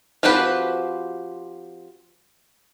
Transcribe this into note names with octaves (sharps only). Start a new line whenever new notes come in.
F3 C4 F#4 G4 B4